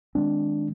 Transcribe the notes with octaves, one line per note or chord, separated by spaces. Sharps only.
D#3 G#3 C4 D4